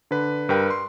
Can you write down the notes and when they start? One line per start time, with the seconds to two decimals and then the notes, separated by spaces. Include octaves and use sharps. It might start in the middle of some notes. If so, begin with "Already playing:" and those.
0.11 D3 B4
0.49 G2 A#4 B4 G5
0.70 C6